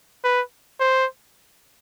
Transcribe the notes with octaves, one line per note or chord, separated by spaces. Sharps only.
B4
C5